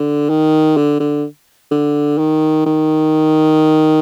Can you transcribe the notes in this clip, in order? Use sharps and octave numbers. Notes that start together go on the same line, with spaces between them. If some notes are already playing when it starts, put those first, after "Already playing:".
Already playing: D3
D#3
D3
D3
D3
D#3
D#3